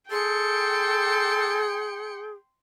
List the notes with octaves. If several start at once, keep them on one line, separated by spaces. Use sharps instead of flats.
G#4 A4 G5 C6 C#7